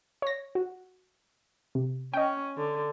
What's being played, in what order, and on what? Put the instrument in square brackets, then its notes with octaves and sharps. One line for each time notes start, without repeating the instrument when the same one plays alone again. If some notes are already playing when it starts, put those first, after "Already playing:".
[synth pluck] C#5 A#6
F#4
C3
[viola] C#4 [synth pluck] D#5 G5
[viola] D3